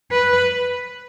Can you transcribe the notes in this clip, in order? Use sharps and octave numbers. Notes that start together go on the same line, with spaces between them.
B4